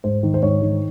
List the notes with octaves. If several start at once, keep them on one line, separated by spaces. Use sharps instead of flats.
G#2 C5
D#3
C5
G#2 C#5
D#3